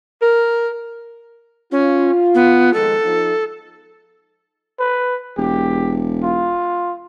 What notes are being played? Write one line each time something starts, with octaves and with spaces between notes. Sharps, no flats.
A#4
C#4 F4
B3
D#3 F3 G#3 A4
F3 D#4
B4
E1 G4
F4